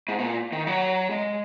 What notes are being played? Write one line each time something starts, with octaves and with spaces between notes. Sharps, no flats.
G#2
B2
A#2
D#3
F#3
G#3